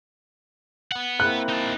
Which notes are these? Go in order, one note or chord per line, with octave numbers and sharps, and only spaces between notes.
B4 F#5
A#3 C4 E4 F#6
D#4 A5